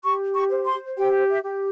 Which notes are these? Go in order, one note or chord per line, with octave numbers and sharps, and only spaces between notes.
G4 C#6
C#6
C5
C6
G4 G5
E5
G4